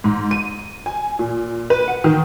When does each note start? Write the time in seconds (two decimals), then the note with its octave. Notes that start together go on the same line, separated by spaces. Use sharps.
0.04 G#2
0.31 D#7
0.86 G#5
1.19 A#2
1.70 B4
1.88 F#5
2.04 D#3